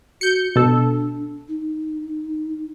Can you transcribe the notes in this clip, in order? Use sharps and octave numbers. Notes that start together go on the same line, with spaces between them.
F#4 G6 C#7
B2 D4 A4
D#4